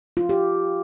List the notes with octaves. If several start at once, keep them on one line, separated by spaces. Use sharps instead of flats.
F4
G4